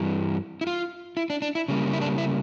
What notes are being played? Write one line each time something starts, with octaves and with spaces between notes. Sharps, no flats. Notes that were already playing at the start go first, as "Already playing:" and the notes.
Already playing: G2 E3 G3
E4
F4
E4
D4
D4
E4
C#3 G3 A#3
E4
D4
E4